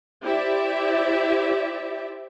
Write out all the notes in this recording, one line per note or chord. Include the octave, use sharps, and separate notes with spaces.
E4 G4 C5 D5 E5